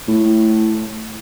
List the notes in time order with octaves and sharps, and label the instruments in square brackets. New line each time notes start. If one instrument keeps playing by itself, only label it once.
[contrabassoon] A2